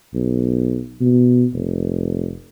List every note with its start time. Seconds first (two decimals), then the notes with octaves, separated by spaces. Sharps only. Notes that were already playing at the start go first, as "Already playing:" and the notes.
0.14 B1
1.01 B2
1.53 F1